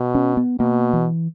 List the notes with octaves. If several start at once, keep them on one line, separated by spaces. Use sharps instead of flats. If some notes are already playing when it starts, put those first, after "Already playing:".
Already playing: B2
C#4
B3
B2 A#3
E3